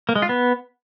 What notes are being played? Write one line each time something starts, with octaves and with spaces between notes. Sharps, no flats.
A#3
G#3
F4
B3